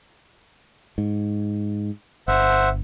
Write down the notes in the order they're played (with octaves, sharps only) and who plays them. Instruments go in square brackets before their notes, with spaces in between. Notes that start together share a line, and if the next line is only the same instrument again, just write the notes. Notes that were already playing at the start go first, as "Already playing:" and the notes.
[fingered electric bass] G#2
[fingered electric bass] G1 [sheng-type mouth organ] C5 E5 F#5